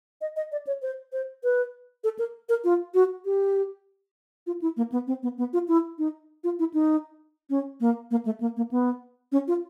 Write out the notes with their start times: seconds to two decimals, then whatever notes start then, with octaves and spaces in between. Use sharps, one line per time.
0.21 D#5
0.36 D#5
0.52 D5
0.67 C#5
0.82 C5
1.13 C5
1.43 B4
2.04 A4
2.19 A#4
2.49 A#4
2.64 F4
2.94 F#4
3.25 G4
4.47 F4
4.62 E4
4.77 A#3
4.92 B3
5.07 C4
5.23 B3
5.38 B3
5.53 F4
5.68 E4
5.98 D#4
6.44 F4
6.59 E4
6.74 D#4
7.50 C#4
7.80 A#3
8.11 A#3
8.25 A3
8.41 A#3
8.57 A#3
8.71 B3
9.32 C#4
9.48 F4